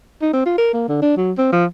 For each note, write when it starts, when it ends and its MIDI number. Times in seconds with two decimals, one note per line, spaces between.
0.22 0.32 63
0.33 0.45 60
0.46 0.54 65
0.58 0.71 70
0.74 0.86 58
0.88 1.02 50
1.02 1.15 62
1.17 1.32 54
1.38 1.49 60
1.52 1.65 53